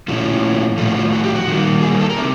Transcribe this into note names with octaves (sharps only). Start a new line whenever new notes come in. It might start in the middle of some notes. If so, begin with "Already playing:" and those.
A#2 F3 A3 C#4 E4 F#4
A2 F3 A3 F4
F#4
F4
F#4
G4
F#4
D#3 G3 A#3
G#4
A4
A#4
C3 E3 G#3